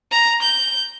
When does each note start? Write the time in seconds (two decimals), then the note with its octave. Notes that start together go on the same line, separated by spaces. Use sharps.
0.11 A#5
0.42 G6